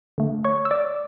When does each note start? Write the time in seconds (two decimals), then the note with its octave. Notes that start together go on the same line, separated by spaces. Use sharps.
0.18 D3 A3
0.44 C#5 C#6
0.65 E6
0.71 D5 D6